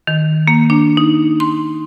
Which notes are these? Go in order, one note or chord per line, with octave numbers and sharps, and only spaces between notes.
D#3
A#3
D4
D#4
C6